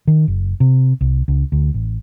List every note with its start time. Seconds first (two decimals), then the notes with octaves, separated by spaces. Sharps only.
0.07 D#3
0.28 F#1
0.60 C3
1.01 C2
1.28 C#2
1.52 D2
1.74 A1